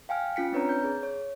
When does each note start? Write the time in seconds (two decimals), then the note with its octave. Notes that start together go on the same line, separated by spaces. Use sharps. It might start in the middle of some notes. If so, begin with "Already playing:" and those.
0.09 F5 G5 G#5 F6
0.36 C#4 F4 B6 C#7
0.52 C4 D4 B4 C#5 A#5
0.69 G6
0.84 G#4
1.03 C#5